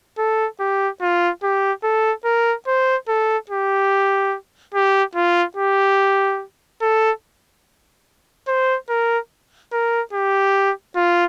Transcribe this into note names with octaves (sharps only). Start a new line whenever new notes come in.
A4
G4
F4
G4
A4
A#4
C5
A4
G4
G4
F4
G4
A4
C5
A#4
A#4
G4
F4